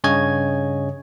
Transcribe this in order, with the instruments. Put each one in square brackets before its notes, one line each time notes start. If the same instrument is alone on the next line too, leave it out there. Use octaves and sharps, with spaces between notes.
[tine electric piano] G2 C#3 C#5 D#5 G#5 G#6